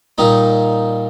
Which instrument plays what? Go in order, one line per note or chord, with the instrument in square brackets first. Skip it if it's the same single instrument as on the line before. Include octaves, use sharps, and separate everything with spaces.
[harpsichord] A#2 G3 A#3 D#4